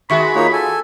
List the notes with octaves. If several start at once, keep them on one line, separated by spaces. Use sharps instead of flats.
D#3 G#3 F#4 E5 B5 C#6
A#3 D#4 F4 C#5
A4 G#5